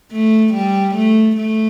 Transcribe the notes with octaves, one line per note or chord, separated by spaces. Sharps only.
A3
G3
A3
A3